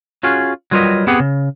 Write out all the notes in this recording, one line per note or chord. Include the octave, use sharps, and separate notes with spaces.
C#4 F4 F#4 G#4
F#3 G3 F4 A#4 B4 D#5
B3 C4 G4 G#4 F#5
C#3